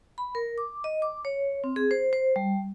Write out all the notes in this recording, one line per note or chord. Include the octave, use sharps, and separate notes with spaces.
B5
A#4
D6
D#5
D6
C#5
C4
G#4
C5
C5
G3